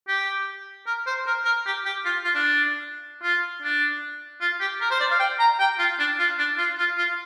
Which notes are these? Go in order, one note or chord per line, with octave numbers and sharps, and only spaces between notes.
G4
A#4
C5
A#4
A#4
G4
G4
F4
F4
D4
F4
D4
F4
G4
A#4
C5
D5
F5
G5
A#5
G5
F4
D4
F4
D4
F4
F4
F4